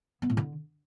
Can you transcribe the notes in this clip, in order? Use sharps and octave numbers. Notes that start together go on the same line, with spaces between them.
B3
A2
D3